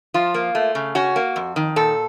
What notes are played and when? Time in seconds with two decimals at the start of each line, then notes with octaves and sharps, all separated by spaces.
0.14 F3 F4
0.34 A#3
0.55 A3
0.75 C#3
0.95 C#4 F#4
1.16 A#3
1.36 F2
1.56 D#3
1.76 A#2 A4